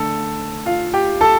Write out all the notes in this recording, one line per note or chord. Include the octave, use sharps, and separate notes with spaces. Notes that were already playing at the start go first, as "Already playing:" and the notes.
Already playing: D3 A3 A4
F4 F5
G4 G5
A4 A5